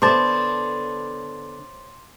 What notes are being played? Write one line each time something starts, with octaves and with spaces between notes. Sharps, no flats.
D3 B3 C5 C#5 A5 C6 D6 A6